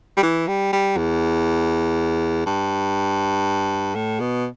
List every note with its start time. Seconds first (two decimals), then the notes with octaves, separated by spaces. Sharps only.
0.17 G3
0.23 E3
0.48 G3
0.73 G3
0.97 E2
2.46 G2
3.95 A2
4.20 B2